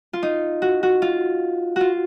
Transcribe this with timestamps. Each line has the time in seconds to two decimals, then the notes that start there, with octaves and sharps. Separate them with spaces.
0.13 F4
0.23 D#4
0.62 F#4
0.83 F#4
1.02 F4
1.76 F4 F#4